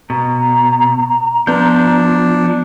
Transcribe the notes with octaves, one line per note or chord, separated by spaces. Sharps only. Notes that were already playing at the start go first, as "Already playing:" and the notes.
B2 A#5
F3 B3 D4 G6